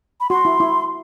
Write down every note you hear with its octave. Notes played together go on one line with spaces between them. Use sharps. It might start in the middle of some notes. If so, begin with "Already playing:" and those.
B5
F#4 C6
E4
E4